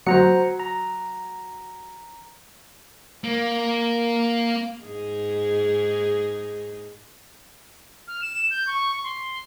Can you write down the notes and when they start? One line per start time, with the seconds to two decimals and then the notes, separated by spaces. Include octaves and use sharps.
0.07 F#3 C5 A#5 C#7
0.60 A#5
3.24 A#3
4.84 G#2 D#4 G#4
8.08 F6
8.22 E7
8.50 G6
8.67 C#6
9.04 C6